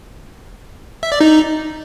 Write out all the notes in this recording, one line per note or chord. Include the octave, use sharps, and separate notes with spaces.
E5
D5
D#4